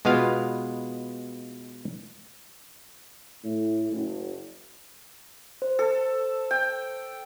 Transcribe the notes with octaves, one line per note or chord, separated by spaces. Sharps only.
B2 G#3 B3 F4 F5
A2
F#1
C5
A4
G5